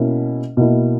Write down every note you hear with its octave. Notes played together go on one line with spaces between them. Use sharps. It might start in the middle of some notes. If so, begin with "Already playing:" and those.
Already playing: B2 A#3 C#4 E4
B2 A#3 E4